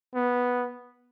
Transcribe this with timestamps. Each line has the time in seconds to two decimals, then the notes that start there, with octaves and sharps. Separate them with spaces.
0.15 B3